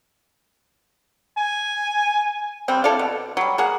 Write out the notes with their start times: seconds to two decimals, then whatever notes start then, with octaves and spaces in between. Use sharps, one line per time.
1.37 G#5
2.68 C3 G3 C4
2.84 E4 A4 D5 F5
2.99 B2
3.37 F#3 G3
3.58 A#3 G#4 A#4 F#5